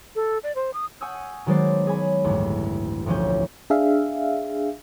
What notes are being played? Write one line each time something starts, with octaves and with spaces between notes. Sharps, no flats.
A4
D5
C5
D#6
F#5 G#5 C#6 D#6 E6 G6
D#3 F#3 G#3 B3 C5 D5
G#4 C#5 G#5 B5
A1 D2 G2
E1 D2 F3 C#4 G6
D4 G#4 E5 F5